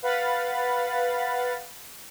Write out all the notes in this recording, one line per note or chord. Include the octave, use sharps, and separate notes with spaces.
B4 F5 F#5 B5 A6